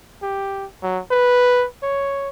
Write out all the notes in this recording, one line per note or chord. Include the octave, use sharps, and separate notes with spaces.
G4
F#3
B4
C#5